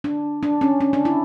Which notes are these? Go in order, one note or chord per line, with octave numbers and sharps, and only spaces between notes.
D4
D4
C#4
C#4
D4
E4